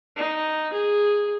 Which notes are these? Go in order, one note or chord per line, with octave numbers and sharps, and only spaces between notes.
D#4
G#4